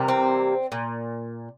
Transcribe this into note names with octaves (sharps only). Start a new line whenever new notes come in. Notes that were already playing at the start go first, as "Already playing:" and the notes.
Already playing: C3 E3 G3 A#3
C4
A#2